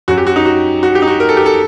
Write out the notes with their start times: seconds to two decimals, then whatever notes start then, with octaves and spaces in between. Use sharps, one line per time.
0.08 F#2 F#3 F#4
0.18 G4
0.27 F#4
0.36 D#4
0.45 F#4
0.83 F#4
0.95 G4
1.02 D#4
1.08 F#4
1.20 A#4
1.29 A4
1.37 G4
1.46 A4